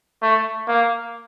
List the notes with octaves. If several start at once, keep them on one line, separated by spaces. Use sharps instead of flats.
A3
A#3